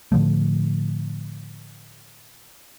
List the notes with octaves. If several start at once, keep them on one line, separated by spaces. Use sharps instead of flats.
A2 D3 F3 A3